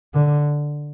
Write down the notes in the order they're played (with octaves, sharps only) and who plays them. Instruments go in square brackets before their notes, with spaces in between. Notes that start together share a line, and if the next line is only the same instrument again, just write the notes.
[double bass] D3